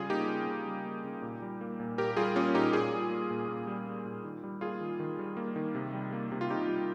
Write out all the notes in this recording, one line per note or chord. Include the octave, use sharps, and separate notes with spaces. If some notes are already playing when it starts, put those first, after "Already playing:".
Already playing: C#3 G3 F4 G#4
A#3 D#4 G4
C#3
C#3
G3
A#3
C#3
A#2
G3
A#3
A#2
A#2 G4 A#4
G3 F4 G#4
A#3 C#4 F4
A#2 D#4 G4
A#2 F4 G#4
G3
A#3
A#2
A#2
G3
A#3
A#2
D#3
G3
A#3 F4 G#4
D#3
D#3
G3
A#3
D#3
C3
G3
A#3
C3
F4
C3 D#4 G4
G3